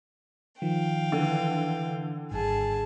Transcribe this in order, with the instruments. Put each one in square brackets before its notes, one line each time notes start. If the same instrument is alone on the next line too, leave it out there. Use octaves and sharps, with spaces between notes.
[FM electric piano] D#3 F3 [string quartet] F5 G5
[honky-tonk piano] D3 [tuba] E3
[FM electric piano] G#1 G2 [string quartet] G#4 A5